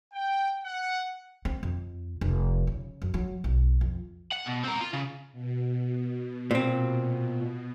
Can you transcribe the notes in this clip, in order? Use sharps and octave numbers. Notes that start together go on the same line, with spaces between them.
G5
F#5
C4
F2
F1
C#3
F#2
F#3
B1
F2
F#5
B2
C4 A#4
F4
C#3
B2
A#2 C4